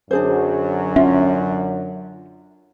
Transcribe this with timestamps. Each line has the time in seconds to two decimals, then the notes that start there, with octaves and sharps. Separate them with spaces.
0.11 F#2 D3 F#3 D4 G#4 C5
0.96 C#4 F4 E5